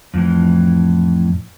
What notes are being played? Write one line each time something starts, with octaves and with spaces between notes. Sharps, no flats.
F2 A2 E3